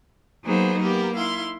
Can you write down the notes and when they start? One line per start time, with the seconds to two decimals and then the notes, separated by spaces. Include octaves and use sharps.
0.44 F#3 A#3 B3 D#4 G#4 C5
0.81 A#3 B3 G4 A#4
1.14 D#4 E4 F5 C6